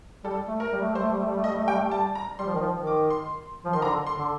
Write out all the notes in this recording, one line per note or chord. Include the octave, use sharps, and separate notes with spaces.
G3 A4
A3
A#4
G3
A3
G3
C5
A3
G3
A3
G3
A3
G3 D#5
A3
G3 G5
A3
G3
A5
A#5
G3 C6
F3
D#3
F3
D#3
D6
C6
F3
D#3 C6
D3 A#5
C6
D3